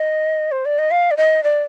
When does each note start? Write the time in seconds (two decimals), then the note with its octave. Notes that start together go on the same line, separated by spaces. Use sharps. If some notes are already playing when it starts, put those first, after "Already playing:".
Already playing: D#5
0.52 C5
0.65 D5
0.78 D#5
0.91 F5
1.11 D5
1.17 D#5
1.43 D5